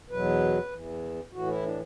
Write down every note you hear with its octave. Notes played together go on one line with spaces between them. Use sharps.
E2 B2 F#3 B4
E2 E3
A2 E3 F#4
E4
D4